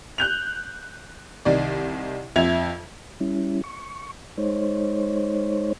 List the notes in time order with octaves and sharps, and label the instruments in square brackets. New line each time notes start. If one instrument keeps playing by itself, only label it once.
[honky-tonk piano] F#6 G6 F7
C2 D#3 D5
F2 F3 E5 G#6 F7
[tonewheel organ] G3 C#4 E4
C#6
G#3 D#4 C5 C#5